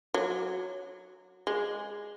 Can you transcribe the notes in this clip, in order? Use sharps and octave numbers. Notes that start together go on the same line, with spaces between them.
F#3
G#3